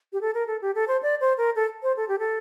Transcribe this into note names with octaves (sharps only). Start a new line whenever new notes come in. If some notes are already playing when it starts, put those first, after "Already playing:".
G4
A4
A#4
A4
G4
A4
C5
D5
C5
A#4
A4
C5
A4
G4
A4